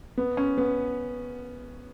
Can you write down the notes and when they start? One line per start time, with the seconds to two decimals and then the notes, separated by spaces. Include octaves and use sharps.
0.18 B3
0.37 C#4
0.58 B3